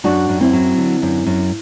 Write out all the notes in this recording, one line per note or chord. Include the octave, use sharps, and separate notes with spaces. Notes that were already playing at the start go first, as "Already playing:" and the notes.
F#2 D4 F#4
F#2
C4 E4
F#3
D3
F#2
F#2